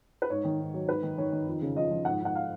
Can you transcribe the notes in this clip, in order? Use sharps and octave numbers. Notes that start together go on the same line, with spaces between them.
B4
G#2 C#5
D#3
G#2
F#3
G#2 B4
D#3
D#3 C#5
D#3
F2
C#3
F3 D#5
F3
G#2 F#5
G#2 F#5
F5